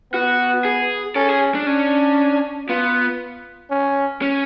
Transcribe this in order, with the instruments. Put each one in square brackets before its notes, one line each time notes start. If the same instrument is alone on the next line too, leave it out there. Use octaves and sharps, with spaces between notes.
[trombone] B3 [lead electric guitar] F#4
[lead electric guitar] G#4
[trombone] C#4 [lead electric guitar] A4
[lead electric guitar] G#4
D4
[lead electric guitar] C#4 [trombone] D4
[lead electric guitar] B3 [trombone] F4
[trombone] C#4
[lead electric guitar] C#4